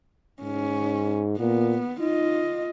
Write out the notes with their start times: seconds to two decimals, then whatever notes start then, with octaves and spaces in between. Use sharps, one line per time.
0.42 G#2 C#4
1.39 A#2 B3
2.01 D#4 F4 D#5